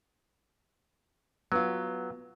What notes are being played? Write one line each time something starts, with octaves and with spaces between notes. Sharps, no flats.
F#3 B3 F4